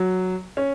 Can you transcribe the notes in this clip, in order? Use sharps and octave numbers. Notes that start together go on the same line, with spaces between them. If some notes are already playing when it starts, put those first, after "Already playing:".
Already playing: F#3
C#4